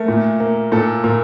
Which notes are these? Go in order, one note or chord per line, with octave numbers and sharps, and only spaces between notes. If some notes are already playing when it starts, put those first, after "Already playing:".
Already playing: A3 A#4
A#2
A#3
A#2 A4
A#2 A#4